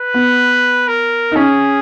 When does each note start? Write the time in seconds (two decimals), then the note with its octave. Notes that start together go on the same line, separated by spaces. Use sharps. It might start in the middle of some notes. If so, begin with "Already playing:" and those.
Already playing: B4
0.14 B3
0.88 A#4
1.32 D#4
1.36 C#4 G#4